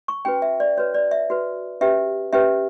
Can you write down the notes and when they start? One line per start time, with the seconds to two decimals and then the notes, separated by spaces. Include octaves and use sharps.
0.08 C#6
0.25 C#4 F#4 B4 G5
0.42 E5
0.60 D5
0.78 F#4 B4 C#5
0.94 D5
1.11 E5
1.30 F#4 B4
1.81 C#4 G4 B4 E5
2.33 C#4 G4 B4 E5